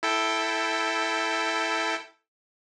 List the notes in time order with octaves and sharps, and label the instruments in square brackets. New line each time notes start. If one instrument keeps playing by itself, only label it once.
[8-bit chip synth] E4 A4 G5